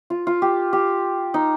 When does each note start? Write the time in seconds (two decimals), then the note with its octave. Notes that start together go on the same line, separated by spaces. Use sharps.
0.10 F4
0.27 F4
0.42 G4
0.73 G4
1.34 D#4